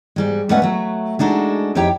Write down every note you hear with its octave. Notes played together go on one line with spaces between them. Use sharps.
G#2 G3 G#3
A#2 G#3 A3 C#4 B4 F#5
F#3 A3
G#3 D4 D#4 F#4 A4
F2 D#4 E4 G4 C#5 G5